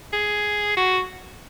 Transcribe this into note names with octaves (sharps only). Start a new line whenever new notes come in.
G#4
F#4